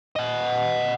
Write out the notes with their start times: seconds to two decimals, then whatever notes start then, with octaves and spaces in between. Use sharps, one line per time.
0.16 D#5 F#5